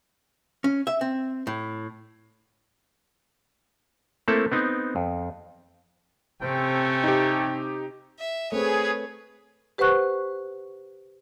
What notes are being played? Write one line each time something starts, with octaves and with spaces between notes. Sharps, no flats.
C#4
E5
C4
A2
A3 A#3 C4 E4 A4
B3 C4 D#4
F2
C3 A3 C4 C#4 G5
D#4 G4
E5
A3 C4 G#4 B4 C#5
G4 B4 C5 F#5 C#6 F#6